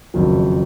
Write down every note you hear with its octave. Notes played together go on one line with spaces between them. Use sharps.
F#1 F2 D#3 F#3